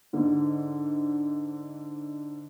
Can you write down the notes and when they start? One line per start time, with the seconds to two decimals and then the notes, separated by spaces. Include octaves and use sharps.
0.13 G#2 D3